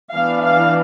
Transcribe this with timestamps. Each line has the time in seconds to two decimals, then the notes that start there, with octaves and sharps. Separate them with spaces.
0.14 E3 B3 D4 F5
0.42 F5